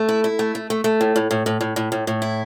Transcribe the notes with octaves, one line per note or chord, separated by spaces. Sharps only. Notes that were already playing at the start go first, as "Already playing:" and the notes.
Already playing: A3
E4
E4
A3
A3
A3
A3
A2
A2
A2
A2
A2
A2
A2
A2
E4